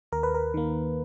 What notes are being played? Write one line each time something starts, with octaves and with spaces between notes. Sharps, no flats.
D#2 A#4
B4
A#4
D#3 A#3